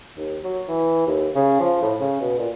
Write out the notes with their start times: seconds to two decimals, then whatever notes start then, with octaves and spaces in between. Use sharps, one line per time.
0.17 D#2
0.44 F#3
0.68 E3
1.06 D#2
1.35 C#3
1.60 F3
1.82 A2
2.00 C#3
2.21 B2
2.38 A#2